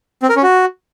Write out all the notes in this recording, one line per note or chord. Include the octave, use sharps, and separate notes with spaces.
C4
A#4
C#4
F#4